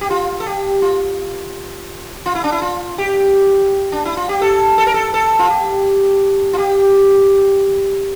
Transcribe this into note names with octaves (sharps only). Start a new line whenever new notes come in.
G4
F4
A4
G4
F4
F4
E4
D4
E4
F4
G4
D4
E4
F4
G4
A4
A4
A#4
A4
A4
F4
G4
F4
G4